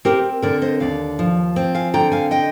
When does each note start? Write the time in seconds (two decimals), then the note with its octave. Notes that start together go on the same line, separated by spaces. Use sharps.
0.05 C4 G4 A#4
0.42 D3 A#4 D5
0.62 C5 D#5
0.80 D#2 D5 F5
1.19 F3
1.56 C4
1.75 F5 G#5
1.94 D3 G5 A#5
2.12 F5 G#5
2.31 D#5 G5